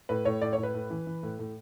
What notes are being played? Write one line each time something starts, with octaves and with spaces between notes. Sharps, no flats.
A2 B4
A2 C#5
A2 D5
C#5
A2
B4
A2
E3
E3
A2
A2